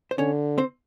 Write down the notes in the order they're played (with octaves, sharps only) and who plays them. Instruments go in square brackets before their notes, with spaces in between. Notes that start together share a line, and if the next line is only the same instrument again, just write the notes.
[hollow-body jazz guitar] C5
[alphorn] D3 [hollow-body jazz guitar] C#4 C#5
[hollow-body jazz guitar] C4 C5